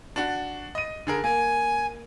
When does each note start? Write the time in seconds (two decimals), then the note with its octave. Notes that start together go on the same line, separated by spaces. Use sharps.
0.16 D4 F#4
0.75 D#5 D#7
1.07 D3 G#4 A#4
1.24 A#3 G#5